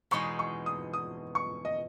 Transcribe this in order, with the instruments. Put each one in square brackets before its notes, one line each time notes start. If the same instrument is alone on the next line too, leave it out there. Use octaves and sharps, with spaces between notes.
[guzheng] E2 B2 G#3 D#4 [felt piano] C#6
[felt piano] C#6
D#6
D#6
C#6
D#5